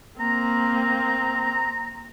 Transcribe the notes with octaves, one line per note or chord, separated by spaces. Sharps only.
A#3 C4 A#5